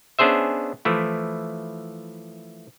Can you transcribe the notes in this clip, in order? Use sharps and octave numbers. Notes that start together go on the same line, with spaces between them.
B3 C#4 D4 G#4 C5 E5
E3 F3 A3 E4